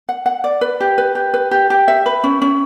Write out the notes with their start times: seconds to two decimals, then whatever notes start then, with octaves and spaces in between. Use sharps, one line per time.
0.09 F#5
0.26 F#5
0.44 D5
0.61 B4
0.80 G4
0.98 B4
1.15 G4
1.34 B4
1.51 G4
1.70 G4
1.88 E5
2.06 B4
2.24 C#4
2.42 C#4